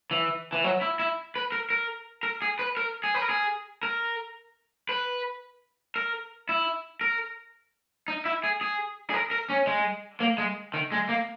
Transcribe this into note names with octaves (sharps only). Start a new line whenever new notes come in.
E3
E3
F#3
E4
E4
B4
A#4
A#4
A#4
G#4
B4
A#4
G#4
B4
A#4
G#4
A#4
B4
A#4
E4
A#4
D#4
E4
G#4
G#4
G#4
A#4
A#4
C#4
G#3
A#3
G#3
D#3
G#3
A#3